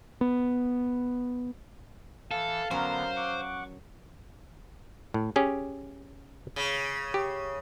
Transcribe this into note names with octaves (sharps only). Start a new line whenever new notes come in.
B3
E3 A4 F5
D3 F#3 B3 C#4 A#4 C5
F#5 C#6 D6
A2
C#4 G4 G#4
C#3
G4